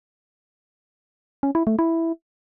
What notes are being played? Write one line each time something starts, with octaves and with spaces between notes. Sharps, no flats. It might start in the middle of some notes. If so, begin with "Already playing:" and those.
C#4
E4
A3
E4